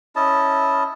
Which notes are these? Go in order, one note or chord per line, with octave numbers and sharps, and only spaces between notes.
C#4 E4 D#5 A5